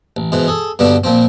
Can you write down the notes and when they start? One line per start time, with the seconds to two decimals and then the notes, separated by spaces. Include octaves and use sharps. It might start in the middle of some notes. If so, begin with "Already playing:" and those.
0.17 A1
0.32 G#2 B2 E3
0.48 G#4 A4
0.79 G2 B2 D3 B3 D4
1.04 A#2 F3 C4